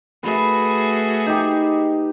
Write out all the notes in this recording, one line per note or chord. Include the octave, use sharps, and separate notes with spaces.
A3 F#4 G#4 B4
D#4 G4